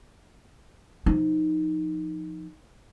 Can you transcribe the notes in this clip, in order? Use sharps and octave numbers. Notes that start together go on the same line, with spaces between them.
F3 D#4